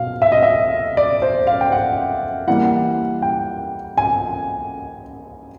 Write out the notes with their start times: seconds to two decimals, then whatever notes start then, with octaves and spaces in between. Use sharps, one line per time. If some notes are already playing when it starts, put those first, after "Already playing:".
Already playing: B2 F5
0.22 E5
0.32 D#5
0.43 E5
0.97 D5
1.22 C5
1.47 F5
1.61 G5
1.72 F#5
2.47 E3 G3 A#3 F#5
3.22 G5
3.97 G#5